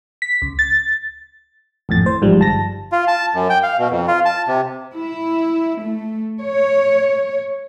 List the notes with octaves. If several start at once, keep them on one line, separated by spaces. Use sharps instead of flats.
B6
C#2
A6
G#1 F2 A2 A6
C5
A1 G#2 F3 G3
G1 A5 A#6
F4
A5
F#2
G5
F5
B2
F2
F4
A5
C3
E4
A3
C#5